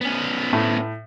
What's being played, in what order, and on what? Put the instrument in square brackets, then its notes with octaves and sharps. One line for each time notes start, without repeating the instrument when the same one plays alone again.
[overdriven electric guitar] B3 C#4
[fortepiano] A2